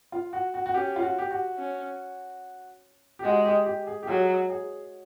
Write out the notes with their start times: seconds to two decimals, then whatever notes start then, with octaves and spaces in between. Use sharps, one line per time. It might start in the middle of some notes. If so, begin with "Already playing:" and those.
0.12 F4
0.33 F#4
0.54 F#4
0.66 F#4
0.74 C#4 G4
0.96 F4
1.02 F#4
1.19 G4
1.31 F#4
1.58 C#4
3.19 G4
3.24 G#3 F#4
3.45 G4
3.66 G4
3.87 G#4
4.03 G4
4.07 F#3 G#4
4.49 G#4